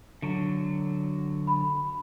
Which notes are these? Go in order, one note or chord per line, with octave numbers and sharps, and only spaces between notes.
D3 F#3
B5